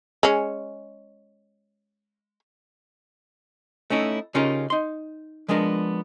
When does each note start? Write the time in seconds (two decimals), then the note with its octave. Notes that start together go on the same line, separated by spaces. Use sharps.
0.23 G#3 C#4
3.90 A3 C#4 D#4 E4
4.35 C#3 C#4 D#4 F4 G4 A#4
4.70 D#4 C6
5.48 F3 G#3 B3 D4 A#4